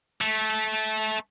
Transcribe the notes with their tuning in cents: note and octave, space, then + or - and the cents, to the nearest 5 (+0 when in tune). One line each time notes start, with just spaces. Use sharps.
A3 -20